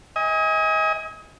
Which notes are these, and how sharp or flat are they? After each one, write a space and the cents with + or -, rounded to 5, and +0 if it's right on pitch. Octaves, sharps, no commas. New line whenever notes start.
D#5 +35 G#5 -20